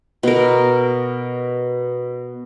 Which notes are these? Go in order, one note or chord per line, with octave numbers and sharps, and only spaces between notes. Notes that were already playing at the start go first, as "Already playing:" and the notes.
B2 A#4